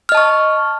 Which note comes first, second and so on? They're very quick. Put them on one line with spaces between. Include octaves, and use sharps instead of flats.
F6 D#5 A5 C#6